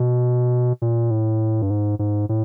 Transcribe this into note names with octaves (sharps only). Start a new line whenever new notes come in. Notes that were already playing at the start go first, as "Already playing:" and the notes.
Already playing: B2
A#2
A2
G2
G#2
G#2
A2